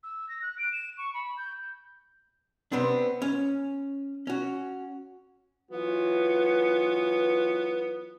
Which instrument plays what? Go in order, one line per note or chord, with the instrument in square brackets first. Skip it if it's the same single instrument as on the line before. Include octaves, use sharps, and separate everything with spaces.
[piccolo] E6
A#6
F#6
D7
E7
C#6
B5
G6
[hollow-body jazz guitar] C3 B3 C4 D4
C#4
C#4 F#4
[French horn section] E3 F#3 F4 [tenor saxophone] B3